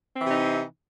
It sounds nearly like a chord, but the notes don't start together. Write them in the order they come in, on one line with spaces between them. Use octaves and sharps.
C4 E3 C3 D#4